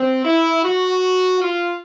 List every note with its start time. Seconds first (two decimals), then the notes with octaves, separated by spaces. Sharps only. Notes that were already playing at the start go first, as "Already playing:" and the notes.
Already playing: C4
0.24 E4
0.63 F#4
1.41 F4